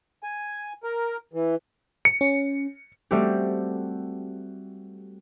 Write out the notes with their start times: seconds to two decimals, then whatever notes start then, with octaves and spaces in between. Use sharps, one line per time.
0.23 G#5
0.84 A#4
1.33 E3
2.05 C#7
2.21 C#4
3.11 G3 A3 C4 F#4 G4